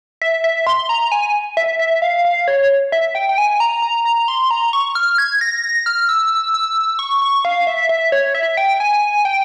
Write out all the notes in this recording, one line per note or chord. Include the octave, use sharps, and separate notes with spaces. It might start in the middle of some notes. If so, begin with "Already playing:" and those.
E5
E5
C6
A#5
G#5
E5
E5
F5
F5
C#5
E5
G5
G5
G#5
A#5
A#5
A#5
C6
A#5
C#6
F6
G#6
A#6
A#6
F6
E6
E6
C#6
C#6
F5
E5
E5
C#5
E5
G5
G#5
G5